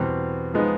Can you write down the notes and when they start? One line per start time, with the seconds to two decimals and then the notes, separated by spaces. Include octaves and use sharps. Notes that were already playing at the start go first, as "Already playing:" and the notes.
Already playing: E2 B2 G3 C4
0.54 F3 G#3 B3 D#4